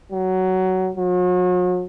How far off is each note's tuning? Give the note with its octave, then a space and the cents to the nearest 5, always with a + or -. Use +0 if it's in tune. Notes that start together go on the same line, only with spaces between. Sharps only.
F#3 +15
F#3 -40